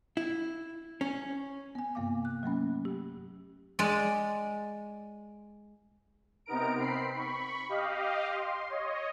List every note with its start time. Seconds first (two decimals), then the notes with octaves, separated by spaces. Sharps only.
0.17 E4
1.01 C#4
1.75 B3 G#5
1.95 G2 C3 A#3 F5 D6
2.25 F#6
2.43 F#3 A3 A#3 C#4
2.85 G4
3.79 G#3 D5
6.46 C3 B3 D#4 A#4 A#5 D7
6.79 C4 B5 C7
7.13 B5 C#6
7.69 G4 D#5 F5
8.30 C6
8.69 C#5 D#5